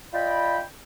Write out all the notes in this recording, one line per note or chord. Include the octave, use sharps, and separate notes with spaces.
F4 D5 D#5 G5 B5